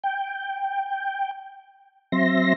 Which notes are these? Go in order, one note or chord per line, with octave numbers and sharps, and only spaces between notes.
G5
F#3 C4 E5 C6 A#6